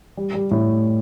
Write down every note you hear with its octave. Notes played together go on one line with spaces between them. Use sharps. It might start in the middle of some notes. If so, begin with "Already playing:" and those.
G3
G3
A2